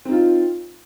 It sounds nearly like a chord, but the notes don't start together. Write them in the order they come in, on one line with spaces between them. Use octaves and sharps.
C4 D#4 F4